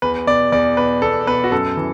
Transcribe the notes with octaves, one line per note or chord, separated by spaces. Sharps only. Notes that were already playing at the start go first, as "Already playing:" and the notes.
E2 B4
B2 D5
E2 D5
B2 B4
E2 A4
B2 B4
F#4
F#2 A4
E3